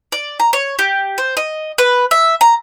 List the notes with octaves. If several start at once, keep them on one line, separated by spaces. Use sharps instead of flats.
D5
A#5
C#5
G4
C5
D#5
B4
E5
A#5